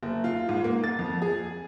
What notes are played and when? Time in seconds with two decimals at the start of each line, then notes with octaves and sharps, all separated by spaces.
0.03 F#1
0.24 F4
0.49 G#2
0.64 A#3
0.84 A6
0.99 F2
1.22 G#4